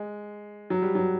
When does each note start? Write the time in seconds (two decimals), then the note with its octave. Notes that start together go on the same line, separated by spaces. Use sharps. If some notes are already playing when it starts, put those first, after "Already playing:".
Already playing: G#3
0.70 F#3
0.82 G3
0.95 F#3